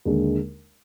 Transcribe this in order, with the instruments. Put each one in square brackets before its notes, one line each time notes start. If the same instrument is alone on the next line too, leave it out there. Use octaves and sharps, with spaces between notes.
[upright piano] D#2 D3 G#3